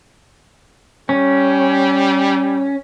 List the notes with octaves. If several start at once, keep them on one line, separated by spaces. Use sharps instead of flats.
G3 C#4